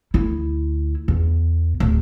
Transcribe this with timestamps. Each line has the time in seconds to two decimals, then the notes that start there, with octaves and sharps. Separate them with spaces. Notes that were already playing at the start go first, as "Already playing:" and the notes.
0.14 D2 E4
1.08 E2
1.80 D1